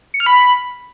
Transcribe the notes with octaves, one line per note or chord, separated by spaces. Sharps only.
C#7
F6
B5